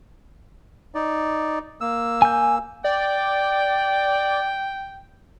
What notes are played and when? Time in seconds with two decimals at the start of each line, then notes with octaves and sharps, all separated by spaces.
0.95 D#4 D5
1.81 A#3 E6
2.22 G#5 G6
2.84 D5 G5